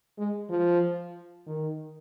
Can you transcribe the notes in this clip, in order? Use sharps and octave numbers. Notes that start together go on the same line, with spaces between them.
G#3
F3
D#3